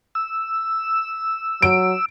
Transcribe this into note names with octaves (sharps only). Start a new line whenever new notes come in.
E6
F#3 D7